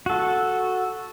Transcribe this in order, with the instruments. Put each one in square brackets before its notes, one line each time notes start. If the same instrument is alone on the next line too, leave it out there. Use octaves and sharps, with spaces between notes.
[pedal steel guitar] F#4 A4